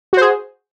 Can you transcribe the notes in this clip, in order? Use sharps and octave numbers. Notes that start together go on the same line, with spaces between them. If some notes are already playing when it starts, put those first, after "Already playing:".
F#4 G#4 C5